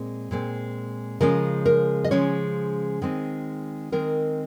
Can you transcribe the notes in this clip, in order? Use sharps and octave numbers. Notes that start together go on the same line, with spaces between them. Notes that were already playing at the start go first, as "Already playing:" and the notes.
Already playing: A#2 G#3 C4
A#2 G#3 C4
C#3 F3 G#3 C#4 A#4
A#4
D#5
C#3 F3 G#3 C#4 C#5
D#3 G#3 C4
D#3 G#3 C4 A#4